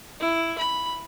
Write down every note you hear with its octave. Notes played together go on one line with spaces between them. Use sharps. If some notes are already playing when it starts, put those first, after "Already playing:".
E4
B5